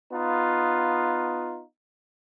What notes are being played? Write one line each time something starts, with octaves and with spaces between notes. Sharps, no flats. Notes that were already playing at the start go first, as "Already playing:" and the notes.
B3 D#4 F4